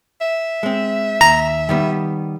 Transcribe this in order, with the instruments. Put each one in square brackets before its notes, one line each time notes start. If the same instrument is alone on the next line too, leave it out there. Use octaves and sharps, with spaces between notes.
[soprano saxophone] E5
[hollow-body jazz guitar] G#3 C4
[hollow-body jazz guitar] D#2 [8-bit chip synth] A#5
[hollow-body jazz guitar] D#3 G3 B3